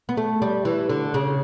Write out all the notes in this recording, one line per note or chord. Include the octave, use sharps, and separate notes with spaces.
B3
A3
G3
E3
D3
C#3